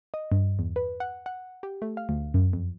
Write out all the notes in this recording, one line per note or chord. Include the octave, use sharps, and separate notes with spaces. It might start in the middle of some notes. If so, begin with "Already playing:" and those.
D#5
G2
E2
B4
F#5
F#5
G4
A3
F5
D2
F#2
F2